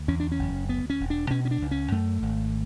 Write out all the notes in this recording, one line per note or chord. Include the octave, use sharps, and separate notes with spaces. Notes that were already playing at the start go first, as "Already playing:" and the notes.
Already playing: D2
E2 C#4
D4
C#4
F#1
D2 B3
C#4
E1
D4
B2 C#4
C#4
D4
C#2
C#4
F#2 A3
G#1